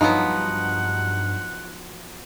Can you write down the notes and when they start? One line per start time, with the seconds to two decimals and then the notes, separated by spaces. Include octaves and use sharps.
0.01 G2 F3 F#3 B3 D#4 F#5